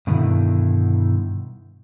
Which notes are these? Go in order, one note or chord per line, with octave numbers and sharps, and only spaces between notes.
G2 B2 D3 D#3 E4